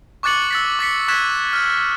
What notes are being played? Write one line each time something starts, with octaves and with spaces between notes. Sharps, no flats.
C#6 D6 F#6 A6 C#7 F#7
E6 A6 B6
D6 A6 B6 C#7
C#6 F#6 G#6 A6 B6 E7
F6 A6